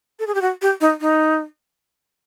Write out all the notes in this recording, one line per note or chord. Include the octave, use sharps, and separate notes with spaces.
A4
G#4
G4
F#4
G4
D#4
D#4